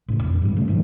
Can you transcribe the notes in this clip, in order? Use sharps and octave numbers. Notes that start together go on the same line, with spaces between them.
A1 A2 C#3
F2 B2
G#2 B2 F3 G3
A#2 C#3 G3 A3
G#2 D3 E3 F#3